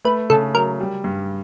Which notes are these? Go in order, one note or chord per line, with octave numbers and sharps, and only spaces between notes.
A3 B4
C#3 A4
F#3 A#4
G3
G2